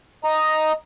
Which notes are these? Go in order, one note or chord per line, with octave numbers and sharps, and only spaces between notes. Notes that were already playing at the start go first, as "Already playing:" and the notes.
D#5 A#5